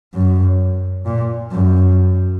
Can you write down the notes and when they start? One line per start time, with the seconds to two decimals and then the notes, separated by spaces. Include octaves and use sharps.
0.14 F#2
1.06 A#2
1.52 F#2